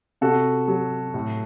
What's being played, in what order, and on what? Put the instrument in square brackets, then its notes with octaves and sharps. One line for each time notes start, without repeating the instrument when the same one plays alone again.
[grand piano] C3 F#4 A4
F#3
A2